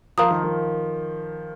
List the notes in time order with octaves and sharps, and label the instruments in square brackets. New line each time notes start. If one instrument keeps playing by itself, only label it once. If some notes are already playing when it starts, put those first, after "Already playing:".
[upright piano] F3 [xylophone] A#4 F5 A#5 D#6
[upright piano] D#3
D#3